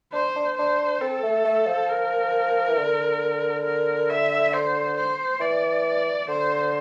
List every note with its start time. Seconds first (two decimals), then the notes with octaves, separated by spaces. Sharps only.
0.13 D4 C5
0.36 D4
0.57 D4 C5
1.01 C4 A4
1.23 A3
1.45 A3
1.67 F3
1.89 A#4
2.69 E3
2.77 D3
3.65 A#4
4.09 E5
4.53 C5
4.97 C5
5.40 E3 D5
6.28 D3 C5